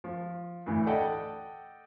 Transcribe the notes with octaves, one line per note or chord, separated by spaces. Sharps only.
F3
D2 A2 E3
A4 D5 D#5 F#5 G5 A5